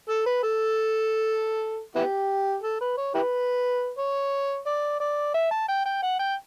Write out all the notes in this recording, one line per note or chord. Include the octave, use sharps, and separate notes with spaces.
A4
B4
A4
B3 E4 G4
A4
B4
C#5
E4 G4 B4
C#5
D5
D5
E5
A5
G5
G5
F#5
G5